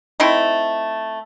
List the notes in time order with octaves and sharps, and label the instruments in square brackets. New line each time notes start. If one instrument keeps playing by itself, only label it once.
[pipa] A3 C4 D#4 E4